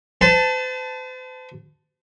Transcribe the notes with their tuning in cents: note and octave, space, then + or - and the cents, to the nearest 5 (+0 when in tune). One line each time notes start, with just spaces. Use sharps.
C5 -45 A5 +0